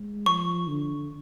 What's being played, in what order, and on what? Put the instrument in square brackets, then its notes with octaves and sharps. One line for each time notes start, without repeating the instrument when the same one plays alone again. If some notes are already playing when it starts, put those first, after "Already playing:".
Already playing: [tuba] G#3
[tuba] F3 [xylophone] C#6
[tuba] D3